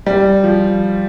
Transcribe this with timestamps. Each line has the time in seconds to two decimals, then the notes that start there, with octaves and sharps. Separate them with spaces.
0.06 G3
0.44 F3